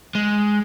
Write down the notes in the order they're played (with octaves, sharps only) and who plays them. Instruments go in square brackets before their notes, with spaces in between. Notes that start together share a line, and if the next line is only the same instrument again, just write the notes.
[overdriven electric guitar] G#3